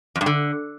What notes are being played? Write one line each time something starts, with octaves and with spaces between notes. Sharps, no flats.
F2
G2
D3